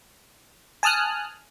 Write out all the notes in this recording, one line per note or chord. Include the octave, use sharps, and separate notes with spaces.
G#5 A5 D#6 F6 F#6